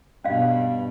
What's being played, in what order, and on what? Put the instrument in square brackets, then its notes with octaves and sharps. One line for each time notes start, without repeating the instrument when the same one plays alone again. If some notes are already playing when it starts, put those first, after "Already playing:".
[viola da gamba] G2 B2 [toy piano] C#4 D#5 F5